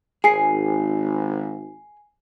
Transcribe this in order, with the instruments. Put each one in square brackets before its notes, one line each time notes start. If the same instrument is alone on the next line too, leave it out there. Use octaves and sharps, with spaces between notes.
[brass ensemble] G#1 [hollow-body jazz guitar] G#4 [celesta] G#5 C7